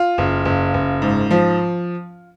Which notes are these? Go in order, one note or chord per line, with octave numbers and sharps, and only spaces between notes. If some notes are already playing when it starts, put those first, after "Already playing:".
Already playing: F4
F#1
F#1
F#1
G#2
F3